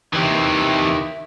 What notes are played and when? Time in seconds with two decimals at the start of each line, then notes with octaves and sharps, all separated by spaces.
0.13 C3 D#3 E3 G4 E5